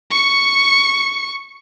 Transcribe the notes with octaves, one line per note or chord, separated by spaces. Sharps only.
C#6 C#7